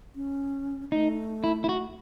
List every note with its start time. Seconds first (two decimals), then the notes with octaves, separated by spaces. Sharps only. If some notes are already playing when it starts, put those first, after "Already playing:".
0.15 C#4
0.92 A3 D#4
1.44 E4
1.64 E4
1.69 F#4